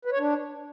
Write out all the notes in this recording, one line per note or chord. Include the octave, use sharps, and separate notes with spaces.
B4
C#5
D4